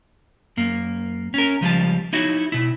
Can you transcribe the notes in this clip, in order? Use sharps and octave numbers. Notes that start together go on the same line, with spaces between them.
F#2 A#3
C#4 A#4
C#2 F3 G3 A5
D#4 E4 F#4 C#5
B2 E4